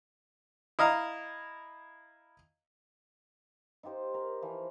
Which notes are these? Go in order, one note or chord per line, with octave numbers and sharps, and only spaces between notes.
E4 D#5 F5 A#5
D#4 F4 G4 C5
A#4
E3 F3